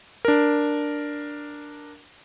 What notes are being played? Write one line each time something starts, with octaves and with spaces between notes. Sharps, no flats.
D4 A#4